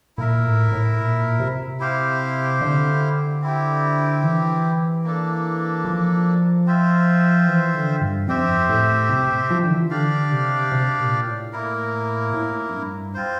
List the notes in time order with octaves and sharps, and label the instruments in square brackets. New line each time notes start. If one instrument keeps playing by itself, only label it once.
[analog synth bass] A#2 [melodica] E4 A#4 E5
[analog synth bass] A2
A2
A#2
C3
[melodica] E4 G4 C5 F5
[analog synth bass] D3
[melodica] C4 E4 G4
[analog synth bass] E3
[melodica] A#3 D4 A4
[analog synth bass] F3
[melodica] C4 F4 C5 E5
[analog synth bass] E3
D3
G2
[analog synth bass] F2 [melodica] C4 G4 C5 E5
[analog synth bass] A2
C3
F3
D3
E3
[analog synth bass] D3 [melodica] D4 G4 D5 F5
[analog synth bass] C3
C3
A#2
A2
[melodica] A#3 E4 A#4
[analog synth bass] A2
F2
G2
[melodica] C4 F4 C5